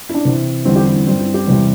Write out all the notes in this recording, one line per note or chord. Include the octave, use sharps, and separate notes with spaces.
E4
D4
C3 E3 C4
E2 D3 G3 C4 E4
G4
E4
E4
G2 G3 C4 E4
E4
G4
E2 C3 G3 C4